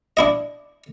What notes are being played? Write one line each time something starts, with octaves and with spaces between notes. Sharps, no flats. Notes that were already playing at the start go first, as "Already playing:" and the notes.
D4 E4 D#5